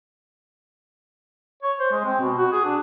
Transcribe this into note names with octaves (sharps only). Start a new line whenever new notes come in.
C#5
C5
G#3
C4
B2
F#4
G#4
D4